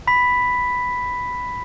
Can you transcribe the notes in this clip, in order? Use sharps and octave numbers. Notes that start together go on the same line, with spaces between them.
B5 B6